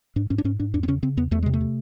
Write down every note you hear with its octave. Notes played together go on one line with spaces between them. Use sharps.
G#2 D4
G#2 C#4
D4
G#2 C#4
G#2 D4
E2 D4
C4
C#3 C#4
C#3 C4
E2 B3
E2 A3
C3 G#3
A3
C3